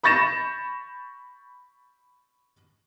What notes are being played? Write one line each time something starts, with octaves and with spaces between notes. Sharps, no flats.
B5 C#6 G6 A6 A#6 E7